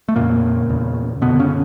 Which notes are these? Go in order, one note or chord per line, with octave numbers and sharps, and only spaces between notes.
A3
F2 A#2 C#3 A#3
E2 C#3
F#2 B2 D3 B3
C#3 C#4